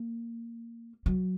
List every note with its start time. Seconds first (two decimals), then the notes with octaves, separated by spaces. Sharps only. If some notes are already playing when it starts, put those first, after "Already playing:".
Already playing: A#3
1.06 F#3